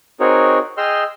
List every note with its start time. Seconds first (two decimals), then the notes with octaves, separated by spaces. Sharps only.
0.20 C4 D#4 F#4 G#4 A#4 C#5
0.77 G#4 D#5 G5 C6 E6 F6